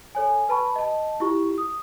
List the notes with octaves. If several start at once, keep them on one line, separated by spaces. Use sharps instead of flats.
A4 C#5 G#5
B4 A5 B5 C#6
D#5 A5
E4 F4 G4 C#6
D#6